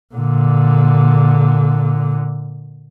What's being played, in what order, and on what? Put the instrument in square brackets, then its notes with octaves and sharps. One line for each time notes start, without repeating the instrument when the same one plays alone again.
[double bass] A#2 D3